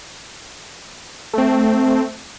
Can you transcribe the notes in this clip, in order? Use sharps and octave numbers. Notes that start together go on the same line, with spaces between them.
A3 C4